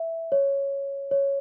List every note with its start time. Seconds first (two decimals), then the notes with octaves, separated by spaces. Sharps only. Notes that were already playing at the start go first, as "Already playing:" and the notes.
Already playing: E5
0.32 C#5
1.11 C#5